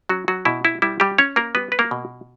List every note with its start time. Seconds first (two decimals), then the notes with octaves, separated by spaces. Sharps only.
0.09 F#3 C#4 F#4
0.28 F#3 F#4
0.45 B2 E4
0.65 E4
0.82 G3 E4
1.00 G3 G4
1.18 C#4 C#5
1.36 A#3 A#4
1.55 G3 B3 B4
1.72 B4
1.79 A#3 A#4
1.91 B2